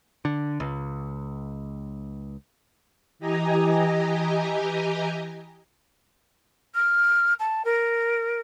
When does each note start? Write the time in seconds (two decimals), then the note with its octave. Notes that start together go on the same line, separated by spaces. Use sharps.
0.25 D3
0.60 C#2
3.19 E3 G4 D#5 G#5 A#5
6.74 F6
7.39 A5
7.64 A#4